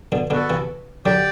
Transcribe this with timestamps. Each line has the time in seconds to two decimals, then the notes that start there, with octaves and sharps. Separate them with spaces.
0.12 B2 D3
0.30 B2 D3 B3 F#4 A4
0.50 C3 E3
1.05 D3 F#3 G4 D5 G5